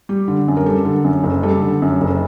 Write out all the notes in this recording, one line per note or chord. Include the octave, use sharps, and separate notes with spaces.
G3
D3
F#2
A#4
G3 A4
D3
F#2
F#1
G3 A4
D3
F#2
F#1